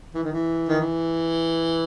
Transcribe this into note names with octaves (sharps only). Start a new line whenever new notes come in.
E3
D#3
E3
D#3
E3